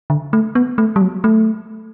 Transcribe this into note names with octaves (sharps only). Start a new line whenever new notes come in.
D3
A3
B3
A3
G3
F#3
A3